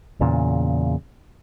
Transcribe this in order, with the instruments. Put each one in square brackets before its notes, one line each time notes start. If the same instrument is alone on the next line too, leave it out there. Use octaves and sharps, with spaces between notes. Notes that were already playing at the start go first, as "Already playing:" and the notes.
[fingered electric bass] E2 A#2 C#3